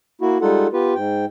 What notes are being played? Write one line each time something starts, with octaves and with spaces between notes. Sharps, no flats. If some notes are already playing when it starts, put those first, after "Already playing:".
A#3 E4 F#4
G3 G#3 D#4 F4 A4 F#5
B3 F4 G4 B4
G#2 G5